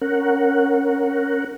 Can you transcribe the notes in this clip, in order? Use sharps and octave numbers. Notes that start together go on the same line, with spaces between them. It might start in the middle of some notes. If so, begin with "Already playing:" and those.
C#4 A#4 F#5